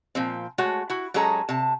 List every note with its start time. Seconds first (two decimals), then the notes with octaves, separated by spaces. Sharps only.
0.15 A#2 F3 C4
0.58 G#3 A3 F#4 C#5
0.90 E4 F#4
1.14 F#3 G#3 C#4 G#4 A4 A#5
1.49 C3 A5